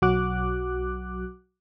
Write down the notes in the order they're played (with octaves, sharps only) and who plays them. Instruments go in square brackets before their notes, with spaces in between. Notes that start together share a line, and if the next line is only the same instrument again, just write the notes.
[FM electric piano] B1 F#3 F#4 D6 F#6